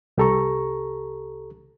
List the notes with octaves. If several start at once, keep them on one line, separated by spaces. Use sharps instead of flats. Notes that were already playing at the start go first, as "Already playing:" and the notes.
C2 G4 A4 A#5 C#6